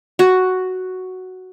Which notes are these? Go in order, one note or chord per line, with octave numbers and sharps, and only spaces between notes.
F#4